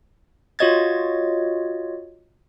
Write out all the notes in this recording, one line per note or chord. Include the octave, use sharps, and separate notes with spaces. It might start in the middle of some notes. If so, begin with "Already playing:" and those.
F4 F#4 C#5 D#5 G#6 A6